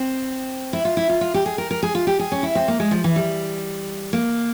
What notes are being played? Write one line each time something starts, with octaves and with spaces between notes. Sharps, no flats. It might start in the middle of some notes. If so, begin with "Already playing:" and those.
Already playing: C4
E4
F4
E4
F4
F4
G4
G#4
A#4
A#4
G#4
F4
G4
G#4
C#4
E4
C4
A#3
G#3
F3
E3
G3
A#3